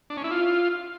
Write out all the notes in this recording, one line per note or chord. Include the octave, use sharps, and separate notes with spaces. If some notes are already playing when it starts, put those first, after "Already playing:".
D4
C#4
E4
F4